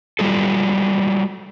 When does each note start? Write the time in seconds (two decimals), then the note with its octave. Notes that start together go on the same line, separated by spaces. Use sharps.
0.19 F#3 G3 F4 A4